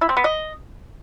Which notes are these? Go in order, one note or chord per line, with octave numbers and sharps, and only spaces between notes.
E4
C4
B3
D#5